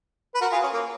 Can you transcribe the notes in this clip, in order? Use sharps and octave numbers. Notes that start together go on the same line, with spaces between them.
B4
F#4 A#4
F4 G#4
C#4
A#3